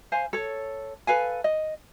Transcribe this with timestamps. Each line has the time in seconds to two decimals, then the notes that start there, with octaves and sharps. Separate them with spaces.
0.12 C5 F5 G#5
0.33 A4 C#5
1.07 A4 B4 F5 G#5
1.44 D#5